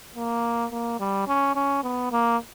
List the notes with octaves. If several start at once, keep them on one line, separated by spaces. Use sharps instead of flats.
A#3
A#3
G3
C#4
C#4
B3
A#3